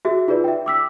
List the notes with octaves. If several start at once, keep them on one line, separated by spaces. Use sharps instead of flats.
F#4 G#4 E5
D#4 F4 G#4 B4 D5
E5 G5
D6 E6 B6